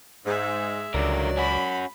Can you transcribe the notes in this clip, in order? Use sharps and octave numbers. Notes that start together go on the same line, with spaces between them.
G#2 G#3 E5
C#2 D3 F#3 A#4 D5
C#4 F#4 B5